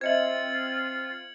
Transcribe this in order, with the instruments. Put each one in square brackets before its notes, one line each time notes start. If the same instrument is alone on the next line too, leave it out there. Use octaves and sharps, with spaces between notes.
[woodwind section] C4 F4 [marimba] C5 D#5 E5 [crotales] G#6 C#7 F#7